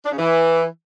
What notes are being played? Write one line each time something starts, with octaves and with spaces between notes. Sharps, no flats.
D4
C#3
E3